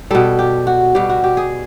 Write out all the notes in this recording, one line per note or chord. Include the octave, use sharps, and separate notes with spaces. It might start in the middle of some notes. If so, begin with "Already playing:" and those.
B2 G3 A4
G4
F#4
B2 G3 G4
F#4
G4
G#4